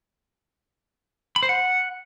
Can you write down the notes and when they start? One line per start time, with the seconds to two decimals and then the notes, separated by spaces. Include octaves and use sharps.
1.36 B5
1.43 C5
1.49 F#5